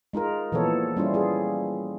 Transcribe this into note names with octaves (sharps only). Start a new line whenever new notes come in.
G#3 D#4 F4 A#4
A#2 E3 F3 B3 A4 C#5
G3 C#4 E4 F4
F4 G#4